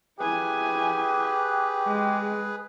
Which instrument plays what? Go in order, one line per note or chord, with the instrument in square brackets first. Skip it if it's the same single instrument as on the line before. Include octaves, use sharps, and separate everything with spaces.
[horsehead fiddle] E4 G#5 [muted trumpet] G4 [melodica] G#4 B4
[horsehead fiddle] G#3